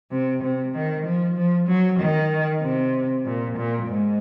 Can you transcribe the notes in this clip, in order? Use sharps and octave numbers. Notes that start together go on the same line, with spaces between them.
C3
C3
D#3
F3
F3
F#3
D#3
C3
A#2
A#2
G#2